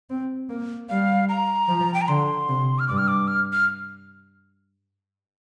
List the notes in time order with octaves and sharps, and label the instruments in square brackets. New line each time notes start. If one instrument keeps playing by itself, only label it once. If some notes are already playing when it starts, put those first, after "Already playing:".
[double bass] C4
A#3
[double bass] G3 [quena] F5
[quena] A#5
[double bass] F3
[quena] G5
A#5
[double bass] D3 [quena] C6
[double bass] C3
[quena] F6
[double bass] G2 [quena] D6
[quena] F6
D6
F6
F6